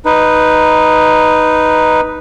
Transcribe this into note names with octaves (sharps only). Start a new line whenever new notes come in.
D#4 B4